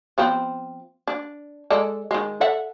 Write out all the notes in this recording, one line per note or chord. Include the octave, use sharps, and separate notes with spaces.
F3 B3 C4
D4
G#3 A4 D5
D#3 G#3
A4 E5 F#5